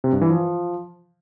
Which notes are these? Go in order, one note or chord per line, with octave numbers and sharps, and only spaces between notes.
C3
G2
E3
F3